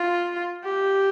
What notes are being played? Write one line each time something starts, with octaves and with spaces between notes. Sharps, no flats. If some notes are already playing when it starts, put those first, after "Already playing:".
Already playing: F4
G4